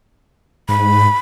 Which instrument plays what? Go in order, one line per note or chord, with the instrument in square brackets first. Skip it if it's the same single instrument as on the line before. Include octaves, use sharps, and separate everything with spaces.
[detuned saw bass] G#2 [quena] B5